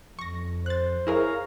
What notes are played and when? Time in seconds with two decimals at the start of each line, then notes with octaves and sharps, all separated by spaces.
0.19 F2 C#6 A#6
0.66 C5 F#6 A6
1.07 E4 G#4 A#4 C#5 F5 A#5